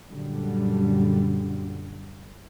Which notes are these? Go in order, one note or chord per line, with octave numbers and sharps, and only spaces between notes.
F#2 A#2 D3 G3